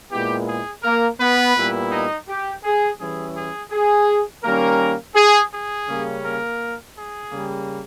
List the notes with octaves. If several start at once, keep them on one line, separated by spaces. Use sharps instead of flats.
A#2 G#3 B3 E4 G4
G#4
A#3 A#4
B3 B4
A#2 G3 B3 E4
D#4 D#5
G4
G#4
E3 G3 C#4 E4 G#4
G#4
G#4
D#3 G3 A#3 C#4 A#4
G#4
G#4
C#3 G3 A#3 C#4
A#3 A#4
G#4
C#3 G3 A#3